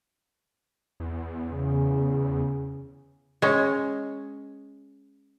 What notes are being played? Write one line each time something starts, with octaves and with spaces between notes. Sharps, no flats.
E2
C#3
G#3 C#4